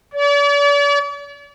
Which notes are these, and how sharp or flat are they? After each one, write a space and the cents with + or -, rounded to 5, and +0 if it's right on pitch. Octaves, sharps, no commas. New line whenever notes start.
D5 -45